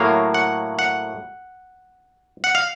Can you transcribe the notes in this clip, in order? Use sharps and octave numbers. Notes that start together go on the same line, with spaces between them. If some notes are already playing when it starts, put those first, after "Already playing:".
Already playing: A2 F#3 A#3 F5
F#5
F#5
F#5
F5